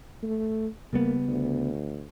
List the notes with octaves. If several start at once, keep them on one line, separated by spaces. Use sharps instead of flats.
A3
C#3 G3 A#3 B3
D2